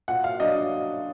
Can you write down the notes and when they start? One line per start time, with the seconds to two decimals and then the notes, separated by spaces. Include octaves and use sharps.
0.08 A#2 F#5
0.24 F5
0.40 F#3 D4 D#5